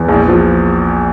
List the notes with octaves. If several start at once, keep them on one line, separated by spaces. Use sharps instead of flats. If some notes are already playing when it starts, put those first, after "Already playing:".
Already playing: E2
A#1
F3